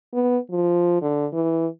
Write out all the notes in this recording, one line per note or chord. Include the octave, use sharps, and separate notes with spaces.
B3
F3
D3
E3